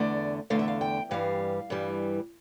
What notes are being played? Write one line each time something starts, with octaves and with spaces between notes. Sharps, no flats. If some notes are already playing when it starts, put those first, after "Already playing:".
Already playing: E2 D3 A3 D5
E2 D3 A3 F5
E5
F5
G5
G2 E3 G3 F5
G2 E3 G3